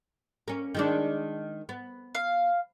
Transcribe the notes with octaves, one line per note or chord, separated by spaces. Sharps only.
A#3 C#4
D#3 G#3 D4
B3
F5